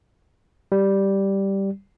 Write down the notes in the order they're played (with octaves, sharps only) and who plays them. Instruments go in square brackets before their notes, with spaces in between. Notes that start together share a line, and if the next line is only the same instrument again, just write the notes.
[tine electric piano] G3